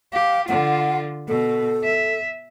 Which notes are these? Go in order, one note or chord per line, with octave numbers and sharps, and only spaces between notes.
G4 F5
D3 F4 F#5
B2 A4
E5